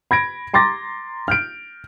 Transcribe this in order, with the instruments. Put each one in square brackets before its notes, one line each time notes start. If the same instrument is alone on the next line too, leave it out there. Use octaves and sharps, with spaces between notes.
[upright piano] B5 G#6 A#6 D7
A#5 C6 D6 A6 A#6
F6 G6 D7